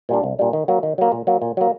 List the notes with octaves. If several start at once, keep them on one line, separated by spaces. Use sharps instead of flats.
A#2 G3 D4
C2
A#2 G3 D4
D#3
F#3 A#3
D#3
F#3 A#3
A#2
F#3 A#3
A#2
F#3 A#3